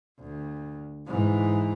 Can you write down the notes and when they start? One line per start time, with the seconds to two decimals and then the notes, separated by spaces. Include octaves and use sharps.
0.20 D2
1.07 G#2 E3